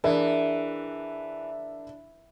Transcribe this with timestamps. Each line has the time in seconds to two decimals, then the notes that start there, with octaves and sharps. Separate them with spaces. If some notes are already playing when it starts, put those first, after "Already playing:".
0.04 E3 D4 G#4 A#4 E5